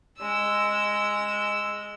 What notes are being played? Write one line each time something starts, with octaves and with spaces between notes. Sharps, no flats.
G#3 E6